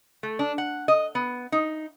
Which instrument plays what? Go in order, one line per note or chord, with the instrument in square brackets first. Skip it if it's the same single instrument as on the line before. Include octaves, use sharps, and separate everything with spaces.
[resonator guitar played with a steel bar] A3
D4
F#5
D#5
B3
D#4